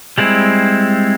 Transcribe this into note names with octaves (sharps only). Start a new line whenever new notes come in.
G3 G#3 C4 E4